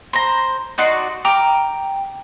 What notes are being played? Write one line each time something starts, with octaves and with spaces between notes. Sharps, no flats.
C5 A#5
D#4 F#4 D5 C6
G5 A#5 D6 F6